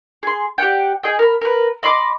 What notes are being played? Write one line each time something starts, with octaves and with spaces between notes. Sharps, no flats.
G#4 C6
G4 D5 F#5 G5
G#4 D#5 G5
A#4 B5
A#4 B4
D#5 B5 C6 D6